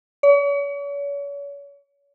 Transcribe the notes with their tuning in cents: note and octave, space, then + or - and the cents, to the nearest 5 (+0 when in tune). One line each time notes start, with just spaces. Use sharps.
C#5 +40